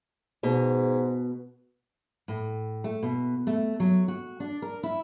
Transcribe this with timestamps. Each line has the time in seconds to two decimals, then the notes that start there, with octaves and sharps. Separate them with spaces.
0.43 G#2 B2
2.28 A2
2.84 A3
3.03 B2
3.47 A3
3.80 F#3
4.08 F#4
4.40 D4
4.62 A#4
4.83 E4